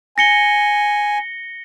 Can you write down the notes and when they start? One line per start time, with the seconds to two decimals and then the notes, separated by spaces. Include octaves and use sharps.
0.18 G#5 A#6 C#7 G7